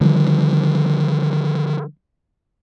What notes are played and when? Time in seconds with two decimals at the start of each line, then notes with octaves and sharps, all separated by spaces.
0.01 D3 D#3 F3 G3